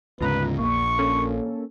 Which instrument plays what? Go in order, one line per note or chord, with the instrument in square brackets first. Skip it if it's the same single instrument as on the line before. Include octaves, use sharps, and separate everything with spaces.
[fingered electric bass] D2 G#2 C#3 [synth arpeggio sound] F4 D#5 A#5 [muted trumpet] B4
[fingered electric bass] A#1 [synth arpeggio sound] E2 A#3 [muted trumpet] C#6
[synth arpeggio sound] A#3 C#4 A4